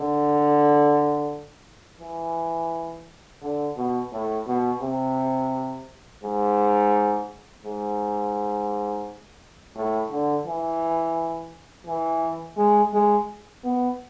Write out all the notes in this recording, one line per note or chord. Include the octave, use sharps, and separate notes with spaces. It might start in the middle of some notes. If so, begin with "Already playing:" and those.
Already playing: D3
E3
D3
B2
A2
B2
C3
G#2
G#2
A2
D3
E3
E3
G#3
G#3
B3